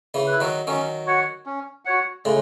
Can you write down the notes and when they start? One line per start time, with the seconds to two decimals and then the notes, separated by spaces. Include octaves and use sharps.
0.14 C#3 E3
0.27 E4 B4
0.40 D#3 F#3
0.67 D#3 F#3 C#4
1.06 F#4 C#5 F#5
1.46 C#4
1.85 F#4 C#5 F#5
2.25 A2 C#3 G#3